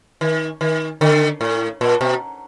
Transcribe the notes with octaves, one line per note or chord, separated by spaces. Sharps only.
D#3
D#3
D3
A2
A#2
B2